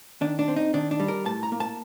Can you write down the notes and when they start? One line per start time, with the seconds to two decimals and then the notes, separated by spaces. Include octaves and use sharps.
0.21 D#3 D4
0.39 D4
0.48 C4
0.56 D#4
0.74 D#3 D4
0.91 D4
1.00 G3
1.08 A#4
1.25 A2 A5
1.43 A#5
1.52 A#3
1.60 A5